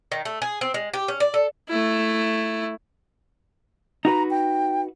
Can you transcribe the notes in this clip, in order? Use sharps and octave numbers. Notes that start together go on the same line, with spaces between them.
D#3
A3
G#4
C4
G#3
G4
C#4
D5
A4
A3 E4
D#4 F#4 B4 A#5
G5